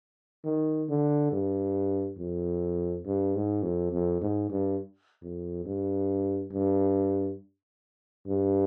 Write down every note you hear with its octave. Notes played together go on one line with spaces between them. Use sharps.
D#3
D3
G2
F2
G2
G#2
F2
F2
G#2
G2
F2
G2
G2
G2